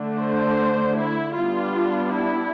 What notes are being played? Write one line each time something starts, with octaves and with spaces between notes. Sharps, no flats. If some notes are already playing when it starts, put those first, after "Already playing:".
Already playing: D3 A3 D4
C5
E4
G3 B3 D4 F4
E4